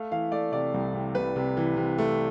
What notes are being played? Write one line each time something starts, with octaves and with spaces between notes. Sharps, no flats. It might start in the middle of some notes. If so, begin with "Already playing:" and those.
Already playing: A3 F5
E3 F5
A3 D5
C3 D5
C2
C3
C2 B4
C3
E3
C3
A3